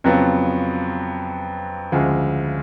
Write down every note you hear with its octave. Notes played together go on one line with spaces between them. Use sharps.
F2 C#3 F#3 B3 F4
D2 C#3 F3 G#3